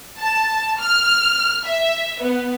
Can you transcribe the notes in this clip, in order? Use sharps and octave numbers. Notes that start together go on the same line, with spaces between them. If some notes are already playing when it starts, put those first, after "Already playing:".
A5
F6
E5
B3